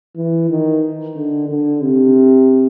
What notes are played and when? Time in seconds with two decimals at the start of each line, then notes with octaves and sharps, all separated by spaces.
0.16 E3
0.49 D#3
1.15 D3
1.48 D3
1.81 C3